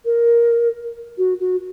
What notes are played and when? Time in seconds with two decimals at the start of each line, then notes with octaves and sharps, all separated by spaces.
0.05 A#4
1.18 F#4
1.40 F#4